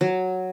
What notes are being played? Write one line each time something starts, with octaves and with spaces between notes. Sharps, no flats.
F#3